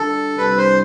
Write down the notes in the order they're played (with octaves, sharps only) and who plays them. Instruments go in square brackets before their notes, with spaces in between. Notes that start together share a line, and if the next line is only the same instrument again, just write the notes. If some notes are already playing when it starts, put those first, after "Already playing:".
Already playing: [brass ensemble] D3 G3 D4 F4 [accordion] A4
[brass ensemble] C2 C3 G3 D4 [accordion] B4
[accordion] C5